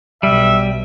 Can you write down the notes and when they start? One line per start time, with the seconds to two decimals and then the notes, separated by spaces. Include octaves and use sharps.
0.23 B1 G3 E5